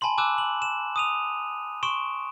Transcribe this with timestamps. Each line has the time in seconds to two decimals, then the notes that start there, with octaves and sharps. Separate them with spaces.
0.01 G#5 A5 B5 C6 F#7
0.18 G#5 D6 E6 F#6 E7
0.38 F#7
0.62 E7
0.96 D#6 D#7 F7
1.83 C6 C#6 D7 E7